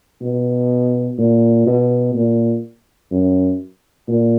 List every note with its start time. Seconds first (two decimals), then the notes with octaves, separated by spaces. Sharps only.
0.21 B2
1.18 A#2
1.67 B2
2.15 A#2
3.11 F#2
4.08 A#2